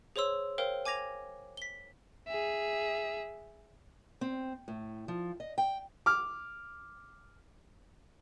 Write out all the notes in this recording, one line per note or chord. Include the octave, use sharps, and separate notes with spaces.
G#4 C5 C#5 C6 E6
A#4 C5 C#5 F5 G5
G#5 D6 G#6 A#6 F7
B6 G7
G#4 E5
C4
A2
F3
D#5
G5
D6 F6